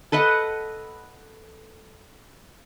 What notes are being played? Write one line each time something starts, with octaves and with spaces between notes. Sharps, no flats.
A4 B4 D#5 F#5